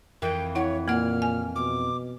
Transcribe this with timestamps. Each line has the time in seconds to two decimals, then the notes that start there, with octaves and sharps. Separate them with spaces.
0.22 F2 E3 A#4 G5
0.55 E4 C#5 F#5
0.88 A#2 A#3 F#5 F6
1.22 G#5
1.56 B2 D6